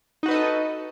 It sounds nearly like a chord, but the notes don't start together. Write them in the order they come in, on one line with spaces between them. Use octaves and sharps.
D#4 F#4 B4 D#5 A4